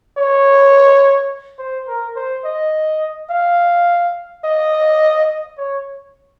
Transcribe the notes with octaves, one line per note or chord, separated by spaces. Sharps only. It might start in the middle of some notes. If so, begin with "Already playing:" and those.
C#5
C5
A#4
C5
D#5
F5
D#5
C#5